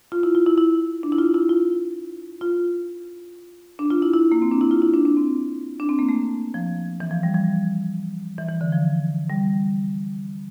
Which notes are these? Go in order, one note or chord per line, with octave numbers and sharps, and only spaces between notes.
F4
E4
F4
E4
E4
D4
E4
F4
E4
F4
F4
D4
F4
E4
E4
A#3
C4
D4
E4
F4
E4
D4
D4
C4
D4
C4
A#3
A3
F3
E3
F3
G3
F3
E3
E3
D3
F3
G3